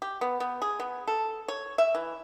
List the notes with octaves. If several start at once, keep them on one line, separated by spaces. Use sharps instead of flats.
G4
B3
B3
G#4
B3
A4
C#5
E5
E3